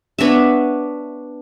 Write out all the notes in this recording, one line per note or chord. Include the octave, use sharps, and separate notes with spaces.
B3 D4 C#5 E5